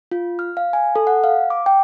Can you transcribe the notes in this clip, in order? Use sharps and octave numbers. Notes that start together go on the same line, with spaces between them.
F4
F6
F5
G#5
A4
F#5
F5
D6
G5